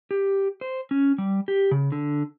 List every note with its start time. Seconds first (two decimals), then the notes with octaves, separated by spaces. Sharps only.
0.11 G4
0.61 C5
0.91 C#4
1.18 G3
1.48 G4
1.71 C#3
1.92 D3